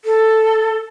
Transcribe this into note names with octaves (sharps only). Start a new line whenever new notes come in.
A4